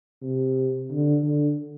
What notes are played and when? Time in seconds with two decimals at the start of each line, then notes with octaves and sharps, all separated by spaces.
0.22 C3
0.90 D3
1.24 D3